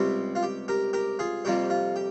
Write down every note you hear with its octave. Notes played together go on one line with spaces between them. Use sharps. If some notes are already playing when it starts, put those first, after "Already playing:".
Already playing: C#2 C3 G3 C4
F4
G4
G4 A#4
G4 A#4
F4 G#4
F2 C3 G3 A#3 F4 G4
F4
G4